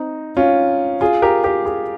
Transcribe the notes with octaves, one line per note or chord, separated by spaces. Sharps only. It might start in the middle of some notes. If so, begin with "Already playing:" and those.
Already playing: C4 D#4
C#4 F4
F4 G#4
G4 A#4
G4 A#4
F4 G#4